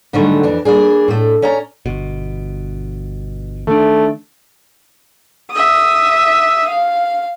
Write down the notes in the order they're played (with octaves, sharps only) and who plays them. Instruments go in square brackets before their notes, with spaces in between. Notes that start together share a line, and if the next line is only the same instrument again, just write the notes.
[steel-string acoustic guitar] G#2 D3 D#3 F#3 G3 A3
F2 E3 D4
G3 A#3 D4 G#4
A2 A3
C#4 C#5 D5 A#5
[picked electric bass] G1 B2
[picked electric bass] D#3 D4 [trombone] A3
[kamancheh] E5 D#6
F5